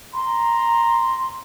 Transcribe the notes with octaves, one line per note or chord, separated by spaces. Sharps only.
A#5 C6